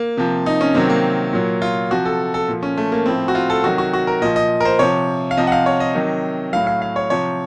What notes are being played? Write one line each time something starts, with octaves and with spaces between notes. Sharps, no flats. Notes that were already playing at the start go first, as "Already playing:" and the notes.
Already playing: A#3
C3 F3
D#4
C#4
C3 D#3 F#3 C4
A#3
A#2 F#3
F4
C3 F3 F#4
A4
A4
A#2 F3
C#4
A3
A#3
A2 F3 C4
F#4
F4
A4
C3 D#3 F#3 F#4
F#4
F#4
A#4
A#2 F3 D#5
D#5
A#4
C5
C3 F3 C#5
F5
C3 F3 D#5
F#5
F5
C#5
D#5
C3 D#3 F#3
A2 F#3 F5
F5
F5
C#5
C3 F3 C#5